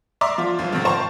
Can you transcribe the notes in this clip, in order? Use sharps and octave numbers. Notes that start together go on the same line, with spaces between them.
D5 E5 A#5 C6 D6
F3 F4
G1 F3
G#2 C3 D#3 F3 F4
C5 G5 A5 A#5 C#6